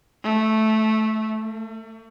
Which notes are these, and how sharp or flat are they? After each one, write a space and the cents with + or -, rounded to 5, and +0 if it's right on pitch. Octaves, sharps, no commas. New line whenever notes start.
A3 -10
A3 +40